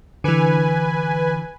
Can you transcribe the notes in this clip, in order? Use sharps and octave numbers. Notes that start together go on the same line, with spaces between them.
D3 E3 B4 G#5